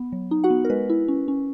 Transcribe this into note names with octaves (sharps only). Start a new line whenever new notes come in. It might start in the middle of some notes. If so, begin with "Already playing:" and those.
Already playing: B3
F#3
D#4
F#4 F#5
B3
A#4
G#3 B4
E4
C#4
C#4